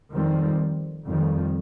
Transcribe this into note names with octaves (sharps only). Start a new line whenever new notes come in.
F2 D#3 G3 C4
F2 D#3 G3